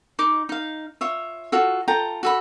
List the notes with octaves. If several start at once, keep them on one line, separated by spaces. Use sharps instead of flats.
D#4 D6
D#4 F5
F4 C#5 E5
F4 F#4 A4
F4 A4 G5 A#5
F#4 A4 B5